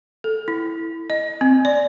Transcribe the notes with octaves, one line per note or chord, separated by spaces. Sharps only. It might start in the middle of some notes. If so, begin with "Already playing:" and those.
A4
E4
D#5
C4
D5